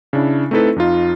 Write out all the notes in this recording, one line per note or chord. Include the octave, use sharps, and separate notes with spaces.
C#3 D4 E4
A3 C4 D#4 E4 A4 B4
F2 D#4 F4